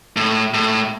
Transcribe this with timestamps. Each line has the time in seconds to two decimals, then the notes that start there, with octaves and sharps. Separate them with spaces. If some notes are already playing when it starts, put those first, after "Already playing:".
0.17 A2
0.54 A2